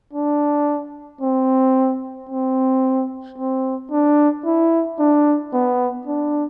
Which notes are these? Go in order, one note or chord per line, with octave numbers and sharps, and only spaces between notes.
D4
C4
C4
C4
D4
E4
D4
B3
D4